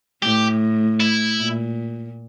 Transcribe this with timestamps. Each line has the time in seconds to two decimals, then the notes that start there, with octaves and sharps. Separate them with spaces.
0.22 A2 G4
1.00 E4
1.39 A#2